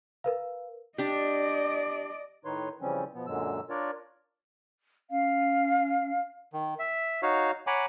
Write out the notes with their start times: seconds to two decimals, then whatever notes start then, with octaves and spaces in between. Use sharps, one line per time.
0.24 A#4 B4 F5
0.98 D4 G4 D5 D#5
2.45 A2 D#3 D#4 B4 C#5 C6
2.81 C#3 E3 F3 G3 C4 C#4
3.14 B2 F3 B3
3.27 F#2 A#2 D3 F#3 G#3 E6
3.70 D4 F4 A#4 C#5 D5
5.10 C#4 F5
6.53 D#3
6.79 E5
7.22 D#4 F#4 C#5 F5
7.67 C#5 F#5 G#5 A#5 B5 D6